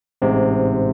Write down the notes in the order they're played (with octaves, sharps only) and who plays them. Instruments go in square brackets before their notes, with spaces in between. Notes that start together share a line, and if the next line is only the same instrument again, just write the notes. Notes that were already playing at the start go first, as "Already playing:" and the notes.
[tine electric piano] A1 G#2 C3